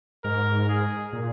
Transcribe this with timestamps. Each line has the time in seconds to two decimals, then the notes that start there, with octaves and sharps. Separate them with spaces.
0.24 G#2 A#4
0.69 G#4
1.13 A#2